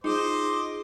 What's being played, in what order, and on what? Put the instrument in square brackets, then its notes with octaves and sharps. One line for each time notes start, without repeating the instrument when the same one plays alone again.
[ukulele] D#4 [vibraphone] F4 G#4 [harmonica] C5 D#5 D6